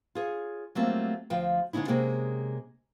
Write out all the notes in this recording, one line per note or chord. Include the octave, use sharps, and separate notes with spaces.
F4 G#4 C#5
F#3 G3 A3 A#3 C4 F4
D2 F3 F4 G5
D3 G#3 C#4 D#4 E4
C3 G#3 A#3 C#4 G#4 G5